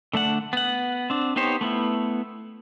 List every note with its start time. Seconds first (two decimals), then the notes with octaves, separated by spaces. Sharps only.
0.13 D3 A3 D4 F#5
0.53 B3 F#5
1.10 C4 D4
1.36 B3 D#4 G4 C5 C#5
1.61 A3 B3 E4